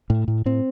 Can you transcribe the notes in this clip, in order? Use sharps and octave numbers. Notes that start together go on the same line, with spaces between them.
A2
A2
A2 C4